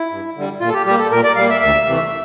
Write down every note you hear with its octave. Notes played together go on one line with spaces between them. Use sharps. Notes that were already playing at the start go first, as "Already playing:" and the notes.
Already playing: E4
G2
D3 G3
A#2 F4
A4
G4
G3 A#3 G4
A4
A#2 A#4
D5
G3 A#3 F5
E5
D2 E5
C3 E3 A3